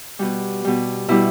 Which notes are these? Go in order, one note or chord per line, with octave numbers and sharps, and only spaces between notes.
B2 G3 F#4
B2 G3
B2 G3 E4